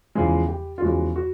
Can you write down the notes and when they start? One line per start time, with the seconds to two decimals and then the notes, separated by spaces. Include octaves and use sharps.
0.15 E2 C#3 F3 G#3 G#4
0.48 G4
0.78 F4
0.82 E2 C#3 F3 G#3 F#4
1.16 F#4